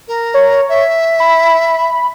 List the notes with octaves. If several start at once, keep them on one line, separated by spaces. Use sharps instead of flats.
A#4
C#5
E5
B5